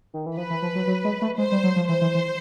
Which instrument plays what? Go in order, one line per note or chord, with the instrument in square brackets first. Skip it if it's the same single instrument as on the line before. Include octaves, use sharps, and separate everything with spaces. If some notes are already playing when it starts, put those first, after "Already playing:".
[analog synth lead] D#3
E3
[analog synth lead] F3 [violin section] B4
[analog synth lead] E3
F3
F#3
F#3
G#3
A3
[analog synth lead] G#3 [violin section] C5
[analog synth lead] G3
F#3
F3
[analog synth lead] E3 [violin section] C5
[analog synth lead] E3
E3